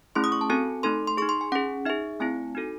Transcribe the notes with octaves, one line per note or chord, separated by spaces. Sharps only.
A3 C#4 E4 G#4 C6
D#6
C#6
A5
C4 F#4 A4 G#5
A3 D#4 A4 C6
C6
D#4 G#4 C#6
C6
G#5
C#4 G#4 F#5
D#4 G#4 E5
A3 C4 E4 G#5
D#4 F#4 A4